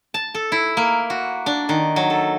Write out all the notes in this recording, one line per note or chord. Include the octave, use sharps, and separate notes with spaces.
A5
A4
E4
A#3
F#4
D4
D#3
F#3
A4